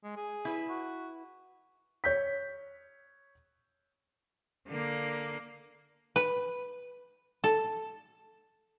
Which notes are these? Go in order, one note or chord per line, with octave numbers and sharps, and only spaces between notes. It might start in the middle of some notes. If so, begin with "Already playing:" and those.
G#3
G#4
E4 B4
F#4
C#5 G6 B6
D3 A#3
B4
A4